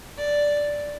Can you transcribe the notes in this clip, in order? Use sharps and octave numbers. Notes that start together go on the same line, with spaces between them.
D5